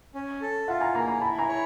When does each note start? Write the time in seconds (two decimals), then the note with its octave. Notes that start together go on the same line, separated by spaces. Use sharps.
0.15 C#4
0.41 A4
0.68 F4 E5 F#5
0.80 G#5 A#5
0.94 A#3 G#5 A#5
1.08 G#5 A#5
1.21 E4 A5 B5
1.38 G#5 A#5
1.49 C#5